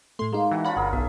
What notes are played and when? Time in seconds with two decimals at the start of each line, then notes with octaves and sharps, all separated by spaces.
0.19 A2 A3 C6
0.32 G#3 A#3 D#4
0.51 E3 F#4
0.65 C#4 D4 F4 F#5 B5
0.77 G1 G#4 A#4
0.93 B1 E5